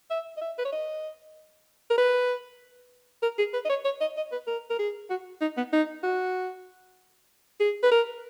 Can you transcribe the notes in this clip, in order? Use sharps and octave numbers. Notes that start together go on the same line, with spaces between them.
E5
D#5
E5
B4
C#5
D#5
A#4
B4
A#4
G#4
B4
D#5
C#5
C#5
D#5
D#5
B4
A#4
A#4
G#4
F#4
D#4
B3
D#4
F#4
G#4
B4
A#4